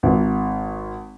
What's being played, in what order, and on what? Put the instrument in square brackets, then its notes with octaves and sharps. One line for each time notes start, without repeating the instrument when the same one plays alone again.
[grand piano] G#1